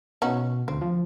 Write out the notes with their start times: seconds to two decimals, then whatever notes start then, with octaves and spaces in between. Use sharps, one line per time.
0.22 B2 C#4 D#4 F#4
0.68 D2 C4
0.82 F3